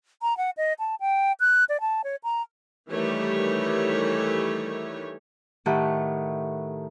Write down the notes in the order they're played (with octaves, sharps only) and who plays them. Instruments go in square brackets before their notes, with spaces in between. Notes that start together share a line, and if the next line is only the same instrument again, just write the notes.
[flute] A#5
F#5
D#5
A5
G5
F#6
D5
A5
C#5
A#5
[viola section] D#3 E3 G3 A3 G4 C#5
[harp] A2 D#3 A3 G4 F#5